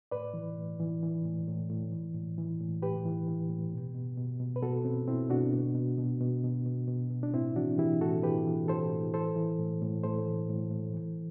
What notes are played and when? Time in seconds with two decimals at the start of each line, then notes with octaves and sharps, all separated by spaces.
0.11 A2 B4 D5
0.34 E3
0.57 A2
0.80 E3
1.03 E3
1.25 A2
1.47 A2
1.70 A2
1.92 E3
2.15 A2
2.38 E3
2.60 A2
2.82 A2 G4 B4
3.06 E3
3.28 E3
3.49 A2
3.73 B2
3.95 B2
4.17 B2
4.40 B2
4.56 B4
4.62 B2 F#4 A4
4.85 B2 C4
5.08 B2 C4 E4
5.30 B2 D4 F#4
5.52 B2
5.75 B2
5.98 B2
6.20 B2
6.44 B2
6.66 B2
6.88 B2
7.11 B2
7.23 D4
7.34 A2 C4 E4
7.56 E3 D4 F#4
7.78 E3 E4 G4
8.01 A2 F#4 A4
8.23 E3 G4 B4
8.47 E3
8.68 E3 A4 C5
8.91 A2
9.14 E3 A4 C5
9.36 E3
9.60 A2
9.82 A2
10.04 A2 A4 C5
10.26 E3
10.49 A2
10.72 A2
10.94 E3